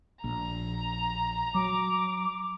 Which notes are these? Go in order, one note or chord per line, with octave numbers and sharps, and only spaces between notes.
A#1 A#5
F#3 D6